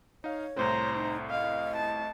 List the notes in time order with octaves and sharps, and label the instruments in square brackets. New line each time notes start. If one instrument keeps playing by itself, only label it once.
[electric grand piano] D#4 F5 [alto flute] C#5
[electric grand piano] C2 A2 C4 [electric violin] C5 A#5
[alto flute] D#4
[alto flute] D#5 [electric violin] F5
[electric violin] A5